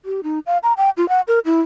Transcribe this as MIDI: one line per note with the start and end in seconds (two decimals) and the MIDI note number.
0.05 0.21 67
0.24 0.39 63
0.46 0.58 77
0.63 0.73 82
0.77 0.90 79
0.97 1.08 65
1.09 1.21 78
1.28 1.39 70
1.45 1.62 64